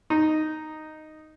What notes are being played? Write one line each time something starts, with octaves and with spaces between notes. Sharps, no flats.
D#4